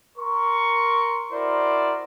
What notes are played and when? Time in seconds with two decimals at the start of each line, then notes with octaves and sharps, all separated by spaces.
0.18 A#4 C6 C#6
1.33 E4 F#4 A#4 C5 D5